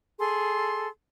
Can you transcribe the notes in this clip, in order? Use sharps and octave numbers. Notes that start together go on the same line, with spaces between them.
G#4 A4 C6